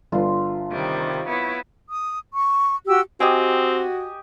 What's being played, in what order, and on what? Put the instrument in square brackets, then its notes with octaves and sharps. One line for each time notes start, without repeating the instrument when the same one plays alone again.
[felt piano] G1 D4 B4 [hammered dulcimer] F4
[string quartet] C3 D#3 G3
B3 E4 C#5
[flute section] D#6
C#6
F#4 G4 E6
[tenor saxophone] C4 [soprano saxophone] F#4 [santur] G4 D#5 G#5